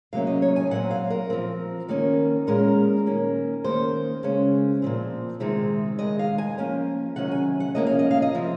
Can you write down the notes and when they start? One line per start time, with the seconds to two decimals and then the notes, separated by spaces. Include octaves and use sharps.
0.13 C3 F#3 A#3 C#4 F5
0.27 D#5
0.42 C#5
0.56 G#5
0.71 A#2 F#3 C4 F#5
0.91 F5
1.10 A#4
1.30 F3 C4
1.89 D#3 A#3 C#4
2.47 A#2 G#3 C#4 A#4
3.06 D#3 A#3 C#4
3.64 D#3 A#3 C#4 C5
4.23 C#3 G#3 C#4
4.82 A#2 F3 C4
5.40 C3 D#3 G#3 C4
5.99 C3 D#3 G#3 D#5
6.19 F5
6.38 G#5
6.58 F3 A#3 C#4 G#5
7.16 C3 D#3 F#3 C#4 F#5
7.31 G#5
7.60 F#5
7.75 C3 F3 A#3 C#4 D#5
7.87 F5
7.99 D#5
8.11 F5
8.22 D#5
8.34 C3 F3 C4